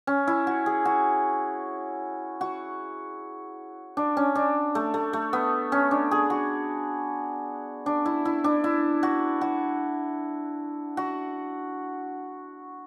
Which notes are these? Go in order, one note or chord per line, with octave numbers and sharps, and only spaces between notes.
C#4
E4
F#4
G#4
F#4
F#4
D4
C#4
D4
A3
A3
A3
B3
C#4
D4
G#4
F#4
D4
E4
E4
D4
E4
F#4
F#4
F#4